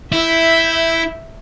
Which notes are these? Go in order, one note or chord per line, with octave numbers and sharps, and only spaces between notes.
E4 E5 G6